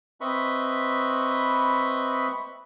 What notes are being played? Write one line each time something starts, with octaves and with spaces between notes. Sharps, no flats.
C4 B4 D#5 E5 B5 C#6